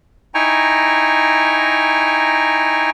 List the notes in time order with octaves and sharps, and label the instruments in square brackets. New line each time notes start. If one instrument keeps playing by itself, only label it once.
[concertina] D#4 E4 G5 G#5 A#5 C#6